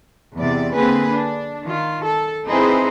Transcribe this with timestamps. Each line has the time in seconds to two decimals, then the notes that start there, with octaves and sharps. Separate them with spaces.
0.36 E2 C3 D5
0.74 D3 A#3 C4 G#4 B4
1.10 D4
1.64 D#3 F4
2.03 A4
2.46 C4 D#4 E4 G#4 B4 C5